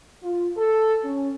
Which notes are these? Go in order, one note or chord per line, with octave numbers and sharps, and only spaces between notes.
F4
A4
C#4